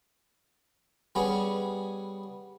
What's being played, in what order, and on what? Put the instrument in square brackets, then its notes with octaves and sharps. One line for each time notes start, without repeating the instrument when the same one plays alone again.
[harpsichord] G3 B3 C#4 G#4